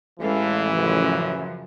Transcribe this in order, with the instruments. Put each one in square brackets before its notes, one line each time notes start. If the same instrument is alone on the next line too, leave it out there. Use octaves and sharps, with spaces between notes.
[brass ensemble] A1 E3 [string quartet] G#3 A4 F5
[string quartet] F#2 C#3 F3